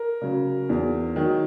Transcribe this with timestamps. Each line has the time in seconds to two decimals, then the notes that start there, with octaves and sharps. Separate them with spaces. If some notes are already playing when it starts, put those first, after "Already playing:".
Already playing: A#4
0.21 C#3 F#3
0.69 E2
1.16 D#3 F#3